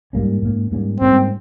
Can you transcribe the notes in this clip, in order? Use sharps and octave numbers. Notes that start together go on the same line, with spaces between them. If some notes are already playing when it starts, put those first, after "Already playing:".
G#2 G3 A#3 C#4
G#2 G3 A#3 C#4
G#2 G3 A#3 C#4
G#2 G3 A#3 C4 C#4